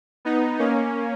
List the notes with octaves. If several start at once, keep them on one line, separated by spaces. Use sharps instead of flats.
B3 D#4
A#3 C#4